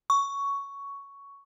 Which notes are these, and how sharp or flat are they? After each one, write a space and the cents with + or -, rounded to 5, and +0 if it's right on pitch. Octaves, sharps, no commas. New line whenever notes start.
C#6 +10